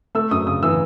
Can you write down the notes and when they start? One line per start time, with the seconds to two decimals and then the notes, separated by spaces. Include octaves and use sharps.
0.15 A3 E6
0.31 F#2 D#6
0.47 C#3 D#6
0.63 E3 E6